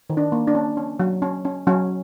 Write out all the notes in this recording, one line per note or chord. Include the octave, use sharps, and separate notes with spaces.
D#3
D4
A#3
D4
C#4
C#4
F#3
C#4
C#4
F#3 C#4